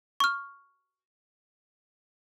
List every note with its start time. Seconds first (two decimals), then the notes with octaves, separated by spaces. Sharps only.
0.20 C#6 F6